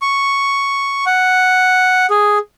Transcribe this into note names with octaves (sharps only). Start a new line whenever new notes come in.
C#6
F#5
G#4